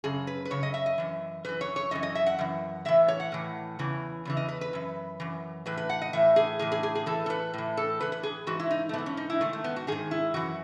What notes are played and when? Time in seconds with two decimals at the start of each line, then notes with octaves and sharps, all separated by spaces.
0.04 F#2 C#3 G#4
0.27 B4
0.45 B4
0.50 F#2 C#3 C#5
0.63 D#5
0.74 E5
0.86 D#5
0.98 F#2 E3
1.45 F#2 E3 B4
1.61 C#5
1.76 C#5
1.91 F#2 E3 D#5
2.03 D#5
2.15 E5
2.26 F#5
2.39 F#2 E3
2.85 A2 E3 E5
3.08 C#5
3.20 F#5
3.32 A2 E3
3.79 E2 C#3 E3
4.25 E2 C#3 E3
4.37 D#5
4.49 B4
4.61 B4
4.73 F#2 E3
5.20 F#2 E3
5.66 A2 E3 B4
5.77 B4
5.90 F#5
6.02 D#5
6.13 A2 E3 E5
6.36 G#4
6.59 A2 E3 G#4
6.72 G#4
6.83 G#4
6.95 G#4
7.06 A2 E3 A4
7.26 A4
7.30 B4
7.54 A2 E3
7.77 A4
8.01 A2 E3 B4
8.12 B4
8.23 G#4
8.47 G#2 E3 F#4
8.60 E4
8.71 D#4
8.89 A3
8.93 G#2 E3 B3
9.06 C#4
9.17 D#4
9.30 E4
9.41 G#2 D#3 A3
9.53 A3
9.64 B3
9.76 F#4
9.87 G#2 D#3 G#4
10.11 E4
10.34 F#2 E3 F#4